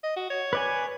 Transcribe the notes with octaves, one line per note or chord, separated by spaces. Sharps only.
D#5
F#4
C#5
B4 D5 G#5